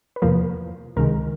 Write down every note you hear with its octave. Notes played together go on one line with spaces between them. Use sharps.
B4
E2 C3 F3 A#3 A#4
C#2 C3 D#3 G#3 A#4